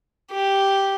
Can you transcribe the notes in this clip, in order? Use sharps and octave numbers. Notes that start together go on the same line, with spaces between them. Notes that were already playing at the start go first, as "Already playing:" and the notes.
G4